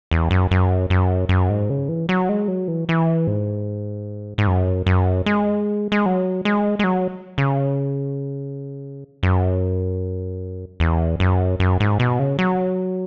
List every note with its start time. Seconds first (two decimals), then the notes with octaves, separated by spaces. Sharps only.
0.11 E2
0.31 F#2
0.51 F#2
0.90 F#2
1.29 F#2
1.50 G#2
1.70 C#3
1.89 E3
2.09 F#3
2.29 G#3
2.48 F#3
2.68 E3
2.89 E3
3.27 G#2
4.38 G#2
4.47 F#2
4.87 F#2
5.26 G#3
5.92 G#3
6.06 F#3
6.45 G#3
6.79 G#3
6.84 F#3
7.38 C#3
9.23 F#2
10.80 E2
11.20 F#2
11.60 F#2
11.80 G#2
12.00 B2
12.19 C#3
12.39 F#3